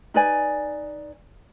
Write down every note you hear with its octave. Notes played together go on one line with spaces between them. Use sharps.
D#4 B4 D5 G#5